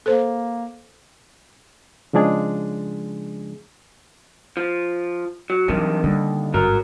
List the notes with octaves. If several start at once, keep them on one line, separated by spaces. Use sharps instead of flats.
A#3 A4 C5
C#3 F3 G#3 D4 G#4
F3
F#3
G2 C3 D#3 E3 F#3
D#2 D3 G3
G#1 G2 F#3 A#4